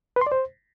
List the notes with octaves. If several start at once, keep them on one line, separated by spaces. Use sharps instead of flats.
B4
C6
D5
C5